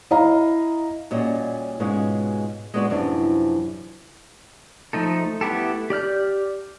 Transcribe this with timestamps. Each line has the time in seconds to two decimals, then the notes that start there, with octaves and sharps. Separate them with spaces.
0.11 E4 D#5 F5 A#5
1.11 A#2 G3 C#4 F4 F#4 D#5
1.80 G#2 B2 G#3 C#4 F4
2.74 G#3 B3 D4 F#4 D5
2.90 F#2 C3 E3 F3 D4
4.93 F3 A3 D#4 A4
5.41 A3 B3 E4 G4 A4
5.90 G4 D5 F6 G6